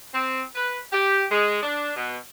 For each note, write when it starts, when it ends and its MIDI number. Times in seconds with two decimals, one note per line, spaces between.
0.14 0.42 60
0.55 0.79 71
0.93 1.24 67
1.32 1.62 56
1.63 1.92 62
1.97 2.18 47